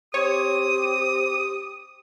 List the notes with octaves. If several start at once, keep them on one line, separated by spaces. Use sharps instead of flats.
C4 G4 C#5 D#6